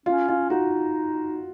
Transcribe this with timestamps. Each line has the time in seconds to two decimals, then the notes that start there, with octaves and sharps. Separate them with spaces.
0.06 C#4 F4
0.28 F4
0.50 D#4 F#4